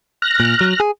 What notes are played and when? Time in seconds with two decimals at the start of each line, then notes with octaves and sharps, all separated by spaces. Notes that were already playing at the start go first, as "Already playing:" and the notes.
0.22 F6 F#6 A#6
0.40 A#2
0.61 F#3
0.80 G#4